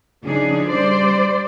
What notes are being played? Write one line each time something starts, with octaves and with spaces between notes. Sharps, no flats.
C#3 F3 D4 D#4 G#4
G3 C5 D5